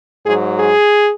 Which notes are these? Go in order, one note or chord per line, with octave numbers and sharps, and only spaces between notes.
G#2 F#3 G#4
G#4